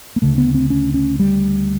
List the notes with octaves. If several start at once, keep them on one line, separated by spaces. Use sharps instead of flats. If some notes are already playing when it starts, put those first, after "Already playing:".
A#3
D2 C#3 A3
B3
C4
C#4
C#4
G3